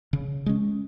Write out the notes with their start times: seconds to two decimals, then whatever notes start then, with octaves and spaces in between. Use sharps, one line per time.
0.13 C#3
0.46 G#3 C#4